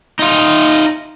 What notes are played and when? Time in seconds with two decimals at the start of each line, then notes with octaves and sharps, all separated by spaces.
0.19 D#4 F4